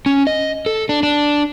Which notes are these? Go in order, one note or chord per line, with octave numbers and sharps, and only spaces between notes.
C#4
D#5
A4
D4
D4